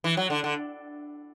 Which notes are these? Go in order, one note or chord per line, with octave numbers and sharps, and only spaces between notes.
E3
F#3
D3
D3